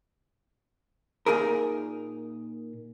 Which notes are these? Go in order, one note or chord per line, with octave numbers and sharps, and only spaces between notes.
A#2 D#4 G#4 A#4